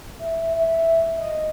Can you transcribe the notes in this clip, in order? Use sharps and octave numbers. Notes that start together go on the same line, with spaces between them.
E5
E5
D#5